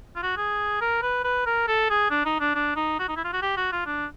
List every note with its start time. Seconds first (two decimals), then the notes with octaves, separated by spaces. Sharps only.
0.16 F4
0.23 F#4
0.37 G#4
0.81 A#4
1.02 B4
1.24 B4
1.46 A#4
1.68 A4
1.90 G#4
2.11 D4
2.25 D#4
2.40 D4
2.55 D4
2.76 D#4
2.99 F#4
3.09 D#4
3.17 E4
3.25 F4
3.33 F#4
3.42 G4
3.57 F#4
3.72 F4
3.86 D4